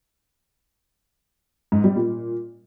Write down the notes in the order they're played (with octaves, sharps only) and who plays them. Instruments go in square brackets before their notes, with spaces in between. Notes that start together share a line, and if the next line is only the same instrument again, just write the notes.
[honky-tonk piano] G#2
G3
A#2